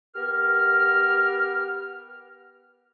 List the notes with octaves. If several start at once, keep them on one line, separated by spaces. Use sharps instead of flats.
B3 G4 A#4 F6